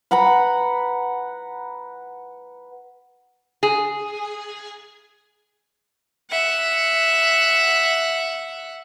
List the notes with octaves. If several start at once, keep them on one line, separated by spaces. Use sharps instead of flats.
B4 F#5 A#5 B5
G#4
E5 F#5